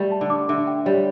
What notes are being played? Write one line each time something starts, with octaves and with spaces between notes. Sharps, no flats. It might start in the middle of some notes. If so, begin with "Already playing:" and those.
Already playing: G3 A3
A5
D3
D6
D3 E5
G5
G3 C#5